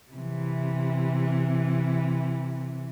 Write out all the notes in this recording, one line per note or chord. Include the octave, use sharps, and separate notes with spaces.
C3 E3